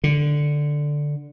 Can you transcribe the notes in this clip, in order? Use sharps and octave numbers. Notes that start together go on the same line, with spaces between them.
D3